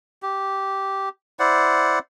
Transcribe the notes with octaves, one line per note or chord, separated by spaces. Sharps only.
G4
E4 C5 D5 F#5